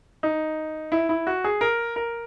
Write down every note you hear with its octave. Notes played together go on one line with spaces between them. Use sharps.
D#4
E4
E4
F#4
G#4
A#4
A#4